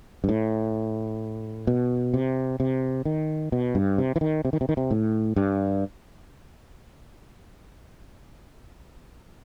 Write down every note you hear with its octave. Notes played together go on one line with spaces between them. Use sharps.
G2
A2
B2
C3
C3
D#3
B2
G2
C3
E3
D#3
C3
D#3
C3
D#3
C3
A2
G2